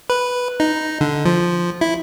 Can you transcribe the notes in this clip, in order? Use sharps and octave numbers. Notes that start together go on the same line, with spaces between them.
B4
D#4
D3
F3
E4